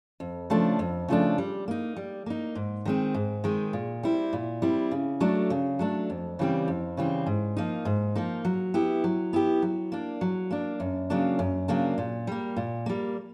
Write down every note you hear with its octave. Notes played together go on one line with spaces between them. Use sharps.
F2
C#3 F3 A3 D4
F2
C#3 F3 A3 D4
G3
A#3 D#4
G3
A#3 D#4
G#2
D#3 G#3 C4
G#2
D#3 G#3 C4
A#2
G3 C4 E4
A#2
G3 C4 E4
C#3
F#3 A3 D4
C#3
F#3 A3 D4
F2
C#3 E3 G3 C4
F2
C#3 E3 G3 C4
G#2
F3 A#3 D#4
G#2
F3 A#3 D#4
F#3
B3 E4 G4
F#3
B3 E4 G4
F#3
A#3 D4
F#3
A#3 D4
F#2
C#3 F#3 A#3 D4
F#2
C#3 F#3 A#3 D4
A#2
G3 A#3
A#2
G3 A#3